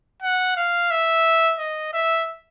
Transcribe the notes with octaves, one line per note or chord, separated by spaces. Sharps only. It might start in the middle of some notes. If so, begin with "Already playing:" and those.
F#5
F5
E5
D#5
E5